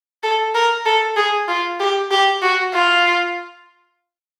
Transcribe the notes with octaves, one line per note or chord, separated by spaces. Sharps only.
A4
A#4
A4
G#4
F4
G4
G4
F#4
F4